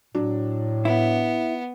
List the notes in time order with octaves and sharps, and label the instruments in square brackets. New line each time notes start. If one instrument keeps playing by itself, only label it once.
[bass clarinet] A2 [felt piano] F#3 D4
[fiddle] B3 [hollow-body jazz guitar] E4